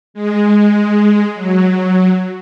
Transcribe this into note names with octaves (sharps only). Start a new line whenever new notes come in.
G#3
F#3